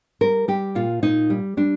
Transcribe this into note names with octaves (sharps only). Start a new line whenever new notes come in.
G3 A#4
G3 G4
A#2 F4
A#2 D#4
G3
G3 D4